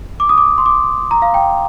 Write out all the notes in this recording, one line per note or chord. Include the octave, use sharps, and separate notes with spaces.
D6
D#6
D6
C6
D6
A#5
F5
G5